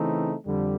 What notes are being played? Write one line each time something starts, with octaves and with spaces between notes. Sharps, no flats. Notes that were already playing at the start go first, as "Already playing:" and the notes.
Already playing: C#3 E3 A3 C4 D#4
F2 D3 G3